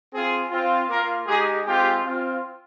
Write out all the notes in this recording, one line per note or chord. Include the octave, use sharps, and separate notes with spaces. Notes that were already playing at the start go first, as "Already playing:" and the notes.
C4 F4 G#4
C4 F4
A#3 F4 A#4
G#3 D#4 G4 G#4
G#3 C4 F4 G4
C4 F4